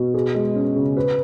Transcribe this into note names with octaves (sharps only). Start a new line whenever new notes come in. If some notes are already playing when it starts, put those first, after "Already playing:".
Already playing: B2
G#4
G#3
C#4
C#3
B4